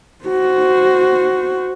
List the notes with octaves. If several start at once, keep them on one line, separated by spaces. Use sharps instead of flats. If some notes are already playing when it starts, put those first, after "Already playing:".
F#4 C5